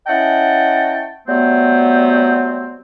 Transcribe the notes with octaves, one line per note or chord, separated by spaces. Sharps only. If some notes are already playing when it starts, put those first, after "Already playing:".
C#4 E4 D#5 F#5 G5 A5
F#3 G3 A3 B3 C4